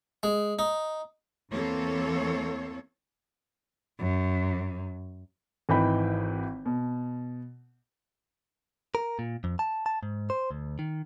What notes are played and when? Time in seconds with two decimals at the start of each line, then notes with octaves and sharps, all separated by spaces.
0.23 G#3
0.59 D#4
1.51 E2 E3 A#3 C4 A4 C#5
3.99 F#2
5.69 G#1 E3 D#4 B4 G5 B5
6.66 B2
8.95 A#4
9.19 A#2
9.44 F2
9.59 A5
9.86 A5
10.03 G#2
10.30 C5
10.51 D2
10.79 D#3